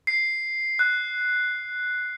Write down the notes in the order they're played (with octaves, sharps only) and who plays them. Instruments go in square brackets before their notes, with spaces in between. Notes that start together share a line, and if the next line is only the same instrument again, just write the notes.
[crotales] C7
F#6